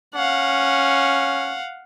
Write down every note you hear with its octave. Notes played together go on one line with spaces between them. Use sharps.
C#4 F5 F#5